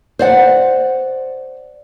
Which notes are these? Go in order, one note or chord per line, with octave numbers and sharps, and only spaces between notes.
C5 D5 F#5